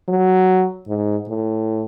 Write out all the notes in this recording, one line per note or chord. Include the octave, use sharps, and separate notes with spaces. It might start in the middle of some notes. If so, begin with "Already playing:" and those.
F#3
G#2
A2